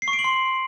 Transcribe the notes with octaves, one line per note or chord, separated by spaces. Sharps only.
C7
C#6
D7
F#7
C6